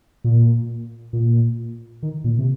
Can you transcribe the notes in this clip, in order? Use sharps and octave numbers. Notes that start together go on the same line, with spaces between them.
A#2
A#2
D#3
A#2
C3